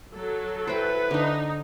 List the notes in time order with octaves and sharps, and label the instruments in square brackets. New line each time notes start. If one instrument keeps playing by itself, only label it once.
[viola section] F#3 A4
[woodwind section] E4 B4 [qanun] C5 G5
[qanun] D3 D4 [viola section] D#4